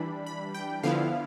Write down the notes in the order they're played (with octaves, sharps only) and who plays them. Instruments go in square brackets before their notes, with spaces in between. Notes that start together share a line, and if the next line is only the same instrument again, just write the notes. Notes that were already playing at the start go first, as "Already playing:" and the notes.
Already playing: [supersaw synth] E3 G3 D4 B5
B5
G5
D3 F3 B3 E4 F5